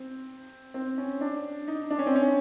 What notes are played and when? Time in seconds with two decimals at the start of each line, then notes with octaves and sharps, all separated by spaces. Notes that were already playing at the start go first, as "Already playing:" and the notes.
Already playing: C4
0.74 C4
0.98 C#4
1.21 D4
1.68 D#4
1.91 D4
1.99 C#4
2.06 C4
2.15 C#4